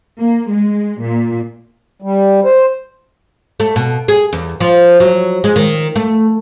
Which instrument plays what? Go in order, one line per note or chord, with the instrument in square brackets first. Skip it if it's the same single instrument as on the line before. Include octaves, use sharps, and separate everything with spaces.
[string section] A#3
G#3
A#2
[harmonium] G3
C5
[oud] A3
B2
G#4
E2
F3
F#3
G#3
D#3
A3